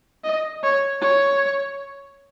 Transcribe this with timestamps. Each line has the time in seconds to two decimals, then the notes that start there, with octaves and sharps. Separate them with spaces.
0.24 D#5
0.63 C#5
1.02 C#5